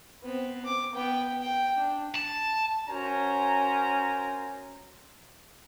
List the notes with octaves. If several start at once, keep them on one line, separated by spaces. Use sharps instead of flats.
B3 C4
D6
B3 G5
G5
D4
A5
C#4 F#4 A#4 C5 G#5 A#5